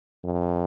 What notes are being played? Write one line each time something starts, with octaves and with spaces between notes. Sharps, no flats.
F2